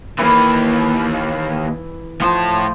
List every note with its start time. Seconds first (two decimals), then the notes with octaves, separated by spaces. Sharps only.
0.18 D#2 E3 A#3
2.22 A2 F3 A5